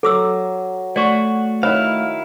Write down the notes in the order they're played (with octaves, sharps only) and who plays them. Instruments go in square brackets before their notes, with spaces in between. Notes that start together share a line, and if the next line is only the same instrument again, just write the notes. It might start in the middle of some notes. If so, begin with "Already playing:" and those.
[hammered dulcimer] F#3 [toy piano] A4 D6 E6
[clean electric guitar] A3 F#4 [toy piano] D5 C#6
[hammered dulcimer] D#3 B5 [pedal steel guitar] E4 F5 [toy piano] C#5